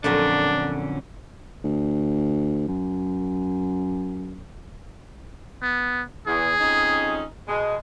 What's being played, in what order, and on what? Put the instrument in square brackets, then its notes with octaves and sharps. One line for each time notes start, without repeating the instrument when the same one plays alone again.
[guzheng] F2 A#2 F#3 [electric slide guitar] D3 C#4 [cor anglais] D4
[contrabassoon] D2
F#2
[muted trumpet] B3
[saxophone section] E2 [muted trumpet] G#4
[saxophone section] F2 C#4 D#4
B2 G#3